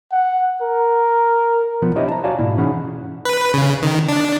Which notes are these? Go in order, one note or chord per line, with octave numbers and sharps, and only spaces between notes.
F#5
A#4
B1 F3 B3
D4 E4 G4 C5 C#5 D#5
A5 A#5
F#4 C#5 D5 F5 G#5 A5
G#2 B2 A#3 E4
E3 C#4 D#4 G#4 F#5 B5
B4
C#3
D#3
D4